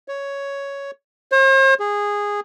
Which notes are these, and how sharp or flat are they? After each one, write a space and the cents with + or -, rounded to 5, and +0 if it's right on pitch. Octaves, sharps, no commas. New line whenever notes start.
C#5 +5
C5 +45
G#4 -15